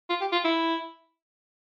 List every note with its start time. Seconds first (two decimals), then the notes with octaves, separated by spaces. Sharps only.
0.09 F4
0.21 G4
0.32 F4
0.44 E4